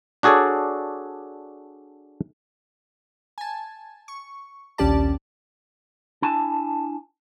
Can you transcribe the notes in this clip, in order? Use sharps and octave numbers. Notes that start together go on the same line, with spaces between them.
D4 F#4 G#4 A4 C#5 D5
G#5 A5
C#6
A#1 D#2 C#4 G4 D5 A5
D4 E4 G#5 A5